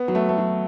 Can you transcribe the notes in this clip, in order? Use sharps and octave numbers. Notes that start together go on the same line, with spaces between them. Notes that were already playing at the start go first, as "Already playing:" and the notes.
Already playing: B3
F#3
A3
A3
F#3